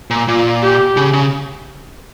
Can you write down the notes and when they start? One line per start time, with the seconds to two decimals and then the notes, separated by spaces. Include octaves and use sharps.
0.10 A#2
0.28 A#2 F4
0.62 G4
0.97 C#3
1.13 C#3